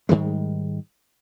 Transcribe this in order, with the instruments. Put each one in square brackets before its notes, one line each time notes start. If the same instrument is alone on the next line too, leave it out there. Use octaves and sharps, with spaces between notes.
[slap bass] G#2 D#3 G3 G#3